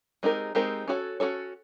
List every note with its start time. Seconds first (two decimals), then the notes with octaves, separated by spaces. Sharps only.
0.23 G#3 C4 D#4 G4 A#4
0.55 G#3 C4 D#4 G4 A#4
0.88 C#4 F#4 A4 C#5
1.20 C#4 F#4 A4 C#5